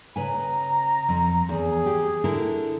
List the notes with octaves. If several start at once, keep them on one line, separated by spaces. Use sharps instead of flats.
C#3 B4 G#5 A#5
F2
E2 G#4
G4
D3 E4 A#4